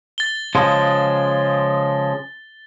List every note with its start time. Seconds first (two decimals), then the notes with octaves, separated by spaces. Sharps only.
0.18 A6 G7
0.55 C#3 F3 G#3